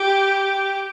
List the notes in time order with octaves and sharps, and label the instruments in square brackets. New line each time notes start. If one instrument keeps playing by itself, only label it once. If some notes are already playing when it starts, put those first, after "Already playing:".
Already playing: [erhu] G4